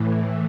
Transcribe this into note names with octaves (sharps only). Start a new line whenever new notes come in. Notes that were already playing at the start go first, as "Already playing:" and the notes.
Already playing: A2 E3